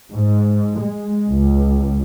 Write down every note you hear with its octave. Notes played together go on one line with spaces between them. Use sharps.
G#2
G#3
C#2